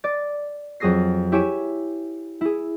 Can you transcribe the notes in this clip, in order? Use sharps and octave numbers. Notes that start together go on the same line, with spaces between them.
D5 A6
F2 F#3 G#4 D#6 A#6 C7
E4 G4 C#5 G#5 D7 E7
E4 G#4